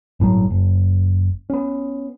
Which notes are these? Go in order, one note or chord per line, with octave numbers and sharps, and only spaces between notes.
G1 A2 C3 F#3
F#1
B3 C#4